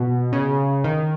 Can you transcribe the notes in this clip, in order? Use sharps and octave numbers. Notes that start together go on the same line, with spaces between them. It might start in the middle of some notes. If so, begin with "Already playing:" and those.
Already playing: B2
C#3
D#3